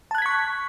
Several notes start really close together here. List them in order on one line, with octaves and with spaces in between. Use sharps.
A5 F#6 G#6 B6 C#6